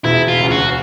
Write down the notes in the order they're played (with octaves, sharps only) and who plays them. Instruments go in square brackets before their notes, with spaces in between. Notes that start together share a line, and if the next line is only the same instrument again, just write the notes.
[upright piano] E1 [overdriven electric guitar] E4
[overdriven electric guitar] F4
[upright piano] D2 C#3
[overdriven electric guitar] F#4